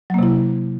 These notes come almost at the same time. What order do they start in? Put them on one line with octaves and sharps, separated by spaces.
F#3 A#3 C3 E4